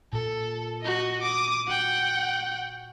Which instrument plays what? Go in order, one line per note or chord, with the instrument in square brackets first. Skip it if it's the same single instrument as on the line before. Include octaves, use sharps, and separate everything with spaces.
[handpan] A#2 [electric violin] A4
[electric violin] F#4 D#5
D6 D#6
[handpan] F#4 [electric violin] F#5 G5